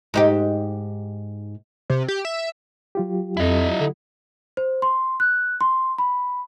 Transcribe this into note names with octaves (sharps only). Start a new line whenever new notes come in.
G#2 D#4 G4
C3
G4
E5
F#3 F4 G4
F2 E4 D#5
D3
C5
C6
F#6
C6
B5